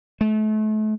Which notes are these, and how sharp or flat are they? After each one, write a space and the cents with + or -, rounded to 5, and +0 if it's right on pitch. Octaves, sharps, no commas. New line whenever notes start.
A3 -35